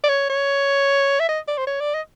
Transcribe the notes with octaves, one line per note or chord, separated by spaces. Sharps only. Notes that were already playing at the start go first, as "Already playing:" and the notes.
D5
C#5
C#5
E5
D#5
D5
C5
C#5
D5
D#5